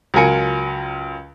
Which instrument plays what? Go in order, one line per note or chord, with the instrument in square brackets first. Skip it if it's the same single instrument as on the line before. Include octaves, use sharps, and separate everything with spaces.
[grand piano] C#2 F#3 F4 A#4 G#5 C#7